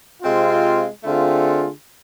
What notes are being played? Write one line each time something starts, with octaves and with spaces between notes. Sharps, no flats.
C3 G#3 C4 F4
D3 A3 C4 F4 G#4